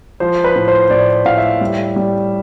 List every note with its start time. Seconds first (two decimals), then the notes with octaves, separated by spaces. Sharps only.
0.20 F3 C5
0.44 B4
0.56 A2
0.68 C5
0.90 A2 D5
1.25 A2 F5
1.38 E5
1.61 G3
1.96 G3